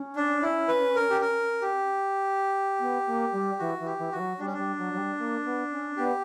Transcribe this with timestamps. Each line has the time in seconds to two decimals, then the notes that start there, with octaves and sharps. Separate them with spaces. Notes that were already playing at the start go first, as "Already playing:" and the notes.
Already playing: C#4
0.16 D4
0.42 E4
0.68 B4
0.95 A#4
1.10 G4
1.21 A#4
1.62 G4
2.80 B3
3.07 A#3
3.32 G3
3.59 E3 F#4
3.80 E3
3.86 G4
3.99 E3
4.12 E3 F#4
4.19 F#3
4.39 G3 D4
4.46 C#4
4.52 D4
4.58 G3
4.78 F#3
4.93 F#3
4.98 G3
5.18 A#3
5.45 B3
5.71 C#4
5.97 B3 G4